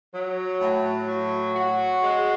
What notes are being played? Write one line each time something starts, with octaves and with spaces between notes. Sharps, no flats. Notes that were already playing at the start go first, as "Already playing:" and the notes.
F#3
A2
F#3
F#4
G#3